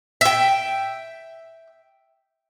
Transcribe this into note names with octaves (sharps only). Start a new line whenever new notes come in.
E5 G5